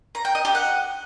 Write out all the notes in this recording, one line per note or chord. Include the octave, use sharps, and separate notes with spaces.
A#5
G5
D#5
G4
F#5